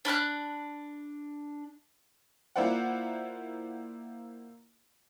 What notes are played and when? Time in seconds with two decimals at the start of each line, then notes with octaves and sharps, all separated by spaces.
0.05 D4 B5 F6 F#6
2.56 A#3 E4 F4 C5 D5 F#5